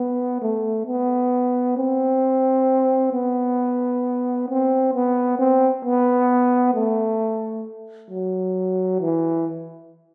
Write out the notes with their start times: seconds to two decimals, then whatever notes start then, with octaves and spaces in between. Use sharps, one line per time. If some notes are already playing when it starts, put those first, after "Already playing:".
Already playing: B3
0.42 A3
0.86 B3
1.77 C4
3.13 B3
4.49 C4
4.94 B3
5.39 C4
5.85 B3
6.74 A3
8.10 F#3
9.01 E3